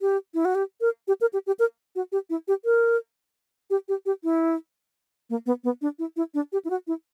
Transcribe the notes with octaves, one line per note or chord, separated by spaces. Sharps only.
G4
E4
F#4
G4
A#4
G4
A#4
G4
G4
A#4
F#4
G4
E4
G4
A#4
G4
G4
G4
E4
A#3
B3
B3
D4
E4
E4
D4
G4
E4
F#4
E4